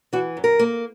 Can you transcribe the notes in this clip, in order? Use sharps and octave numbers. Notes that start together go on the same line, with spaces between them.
E3 F#4
F#2
A#4
A#3